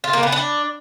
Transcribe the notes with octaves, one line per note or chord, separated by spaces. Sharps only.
F4
A#3
B3
D4